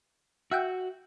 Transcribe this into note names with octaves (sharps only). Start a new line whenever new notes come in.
F#4 E5 F#5 G5